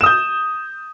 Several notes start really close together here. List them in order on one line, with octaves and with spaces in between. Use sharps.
E7 D#6 G6